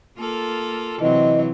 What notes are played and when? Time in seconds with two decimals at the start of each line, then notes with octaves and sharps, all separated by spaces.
0.18 A#3 F4 A4
1.01 C3 E3 F#3 C4 D#5